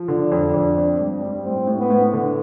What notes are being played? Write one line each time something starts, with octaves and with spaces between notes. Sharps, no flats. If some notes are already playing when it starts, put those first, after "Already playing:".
Already playing: F3
D3 D4
F2
F2
C4
G2
G3
A2 C4
A2
B3
A2
D3